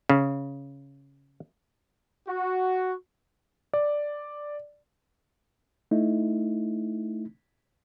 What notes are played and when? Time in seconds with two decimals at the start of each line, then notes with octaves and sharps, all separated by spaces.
0.09 C#3
2.28 F#4
3.74 D5
5.91 A3 D#4 E4